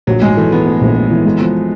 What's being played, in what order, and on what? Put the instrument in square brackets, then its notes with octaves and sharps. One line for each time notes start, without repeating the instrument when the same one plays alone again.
[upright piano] A#1 [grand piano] F#3
[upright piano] G#2 [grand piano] G#3
[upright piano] E3 [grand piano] A3
[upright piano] E3 [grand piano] B3
[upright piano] A3
A#1
A3
E3
G#3
F3